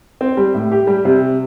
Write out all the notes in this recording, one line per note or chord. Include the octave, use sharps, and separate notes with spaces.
C4
G3
A2
G4
G3
C3